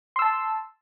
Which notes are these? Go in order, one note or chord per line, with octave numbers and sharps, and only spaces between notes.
A5 C6 E6